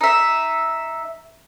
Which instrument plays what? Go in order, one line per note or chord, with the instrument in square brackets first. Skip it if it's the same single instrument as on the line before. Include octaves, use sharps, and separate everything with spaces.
[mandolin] D#4 E5